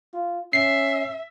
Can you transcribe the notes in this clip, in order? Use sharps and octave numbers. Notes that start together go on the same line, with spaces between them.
F4
C#4 E5 C7